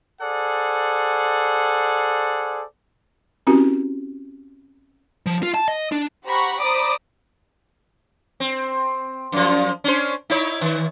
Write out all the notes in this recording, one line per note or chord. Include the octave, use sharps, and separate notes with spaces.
G#4 A4 C5 D5 F#5
C4 C#4 E4 F#4 G4 A#4
F3
F4
A5
D#5
D4
G4 C5 F#5 A#5 B5 C#6
C5 D5 A#5 B5 D6 D#6
C4
F#2 F3
C#4 D4 C5
D#4 E4 C#5
D#3